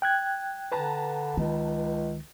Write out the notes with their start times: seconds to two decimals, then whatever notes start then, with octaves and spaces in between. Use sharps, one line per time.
0.02 G5 F#6 G#6
0.72 D3 B4 A5 A#5
1.37 C#2 D#3